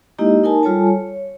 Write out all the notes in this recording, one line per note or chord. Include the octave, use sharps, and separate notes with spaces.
G#3 A#3 D#4 E4 G4 D#5
D#4 A#4 G#5 A5
G3 F4 A4 C#5 G#5 A5
C#5